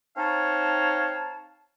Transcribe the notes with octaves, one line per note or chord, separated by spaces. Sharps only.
C4 D#4 C#5 F5 A5